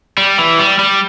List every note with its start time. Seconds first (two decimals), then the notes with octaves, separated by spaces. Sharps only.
0.18 G3
0.38 E3
0.59 G3
0.79 G3